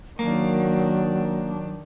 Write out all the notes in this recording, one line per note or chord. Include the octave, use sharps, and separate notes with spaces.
D#3 F#3 A#3 D4